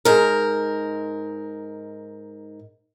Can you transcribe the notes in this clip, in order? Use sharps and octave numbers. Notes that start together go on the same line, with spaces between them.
G#2 A#4